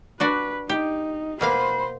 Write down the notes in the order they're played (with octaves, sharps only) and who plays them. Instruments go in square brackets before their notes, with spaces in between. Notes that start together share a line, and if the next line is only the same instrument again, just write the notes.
[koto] D4 F#4 D5 [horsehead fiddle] B4
[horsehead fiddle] D#4 [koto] G4
[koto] B2 A#3 F5 [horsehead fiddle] C5 [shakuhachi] B5